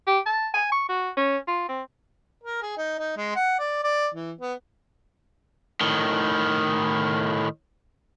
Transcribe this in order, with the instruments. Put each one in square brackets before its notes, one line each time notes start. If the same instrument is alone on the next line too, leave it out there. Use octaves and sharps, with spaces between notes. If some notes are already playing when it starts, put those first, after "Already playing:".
[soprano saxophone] G4
A5
G#5
C#6
F#4
C#4
F4
C4
[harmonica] A#4
G#4
D#4
D#4
G#3
F#5
D5
D5
E3
B3
[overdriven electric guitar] A2 D#3